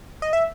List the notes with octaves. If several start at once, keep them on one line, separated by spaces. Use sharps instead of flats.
D#5
E5